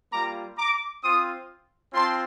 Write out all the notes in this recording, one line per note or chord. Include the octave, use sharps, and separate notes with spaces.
G3 A#3 F4 A#5 D6
A#5 D6
C4 F4 C6 D#6
C4 F4 A5 C6